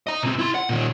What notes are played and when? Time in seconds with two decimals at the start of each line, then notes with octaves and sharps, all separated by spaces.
0.07 D#5 A#5
0.23 B2 C4
0.39 E4 C6
0.55 F#5
0.69 A#2 D#3